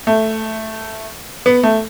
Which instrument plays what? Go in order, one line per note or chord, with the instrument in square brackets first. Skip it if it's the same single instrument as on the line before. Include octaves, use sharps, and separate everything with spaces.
[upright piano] A3
B3
A3